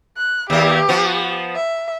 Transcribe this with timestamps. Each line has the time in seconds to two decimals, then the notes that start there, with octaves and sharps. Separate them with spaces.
0.17 F#6
0.50 D#2 A#3 G4
0.89 F3 B3
1.55 E5